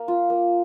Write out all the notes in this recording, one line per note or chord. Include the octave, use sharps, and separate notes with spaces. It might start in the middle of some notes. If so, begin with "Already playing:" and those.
Already playing: A#3
F4
A#3